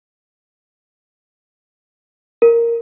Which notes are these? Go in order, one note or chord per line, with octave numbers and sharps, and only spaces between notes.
A#4